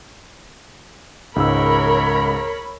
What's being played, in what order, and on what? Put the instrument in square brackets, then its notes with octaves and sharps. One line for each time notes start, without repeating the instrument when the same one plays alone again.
[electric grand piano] C#2 G#2 E6 [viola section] A#4 C#5 B5